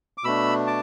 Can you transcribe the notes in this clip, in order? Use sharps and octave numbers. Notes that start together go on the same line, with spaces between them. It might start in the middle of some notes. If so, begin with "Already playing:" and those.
D6
B2 A3 D4 B5 E6
A5 D6